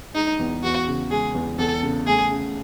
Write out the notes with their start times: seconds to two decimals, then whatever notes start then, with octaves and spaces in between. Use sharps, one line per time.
0.15 G#3 D#4
0.39 E2
0.64 E2 F#4
0.87 C#3
1.10 G#3 G#4
1.34 E2
1.58 E2 A4
1.83 C#3
2.07 A3 G#4
2.30 C#3